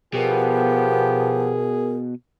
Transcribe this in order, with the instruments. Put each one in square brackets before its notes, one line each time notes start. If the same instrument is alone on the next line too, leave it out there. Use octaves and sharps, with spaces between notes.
[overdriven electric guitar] B2 [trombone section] F3 B3 G4 [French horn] G#4 [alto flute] A#4